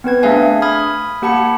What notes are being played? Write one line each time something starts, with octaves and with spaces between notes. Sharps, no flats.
B3 C4 B4 G#6
A3 D4 G#4 E5 F5 G#5
B5 D#6 F6 G#6
A#3 G4 F#5 A5 B5 C#7